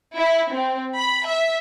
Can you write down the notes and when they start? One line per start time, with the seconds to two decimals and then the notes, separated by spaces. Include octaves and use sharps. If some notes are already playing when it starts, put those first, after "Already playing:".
0.17 E4
0.53 C4
0.96 B5
1.26 E5